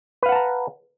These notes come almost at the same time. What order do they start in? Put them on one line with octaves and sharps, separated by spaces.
B4 F5 F#5 A5 A#5